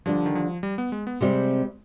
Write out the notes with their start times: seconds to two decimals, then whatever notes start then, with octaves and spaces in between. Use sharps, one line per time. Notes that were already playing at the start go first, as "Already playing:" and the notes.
0.06 D3 F3 G3 D4
0.26 D#3
0.35 F3
0.63 G3
0.78 B3
0.92 G#3
1.07 B3
1.21 C3 G3 G#3 C4